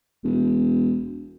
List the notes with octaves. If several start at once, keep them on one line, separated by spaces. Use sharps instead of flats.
E1